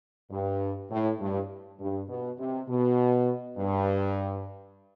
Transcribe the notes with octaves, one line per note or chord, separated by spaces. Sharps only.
G2
A2
G2
G2
B2
C3
B2
G2